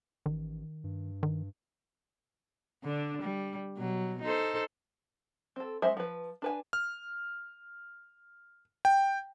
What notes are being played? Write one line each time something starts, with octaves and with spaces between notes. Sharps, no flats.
A1 D#3
G2
D#3
D3 D4
G3
B2 F#3
D#4 A4 C5
C4 A4
G#3 C#4 C5 E5
F3 B4
D4 B4 G#5
F6
G5